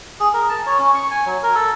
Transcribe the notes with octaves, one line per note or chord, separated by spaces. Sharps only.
G#4
A#4
A5
C#5
C#4
C#6
G#5
F#3
A#4
A4